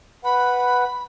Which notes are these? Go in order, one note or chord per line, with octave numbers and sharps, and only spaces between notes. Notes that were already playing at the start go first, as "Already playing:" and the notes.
B4 F#5 B5